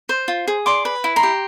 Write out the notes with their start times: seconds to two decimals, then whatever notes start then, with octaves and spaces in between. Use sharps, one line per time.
0.09 C5
0.28 F4
0.48 G#4
0.66 D5 C6 D6
0.85 B4
1.04 E4
1.16 A#5 C6
1.23 G4